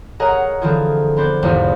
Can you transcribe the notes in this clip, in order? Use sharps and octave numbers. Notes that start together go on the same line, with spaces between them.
G#4 A#4 C#5 D#5 F#5 A#5
D3 E3 F3 C4 F4 G#4
B3 C4 C5 D5
G#1 E2 C3 F3 G3 G#3